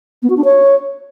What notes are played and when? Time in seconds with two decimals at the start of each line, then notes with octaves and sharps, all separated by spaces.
0.23 B3
0.30 F#4
0.37 D4
0.44 C#5